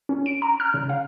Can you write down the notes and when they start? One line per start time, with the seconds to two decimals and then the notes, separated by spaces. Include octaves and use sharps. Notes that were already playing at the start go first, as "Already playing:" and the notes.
0.09 C#4
0.26 D7
0.42 A#5
0.60 F6
0.74 C#3
0.89 F5